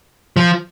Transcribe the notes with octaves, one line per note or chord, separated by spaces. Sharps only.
F3